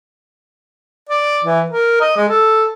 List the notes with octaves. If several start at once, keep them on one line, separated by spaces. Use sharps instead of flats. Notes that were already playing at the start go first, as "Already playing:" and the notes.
D5
E3
A#4
D#5
G#3
A4